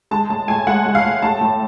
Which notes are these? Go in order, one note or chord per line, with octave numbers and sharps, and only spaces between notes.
G#3 A5
A2 A5
A2 G#5
G#3 F#5
G#3
F5
A2
A2 A5
A2